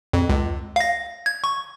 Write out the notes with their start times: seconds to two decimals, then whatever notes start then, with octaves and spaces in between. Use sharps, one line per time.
0.13 F2
0.29 C#2
0.76 F5 A#6
1.26 G#6
1.44 C#6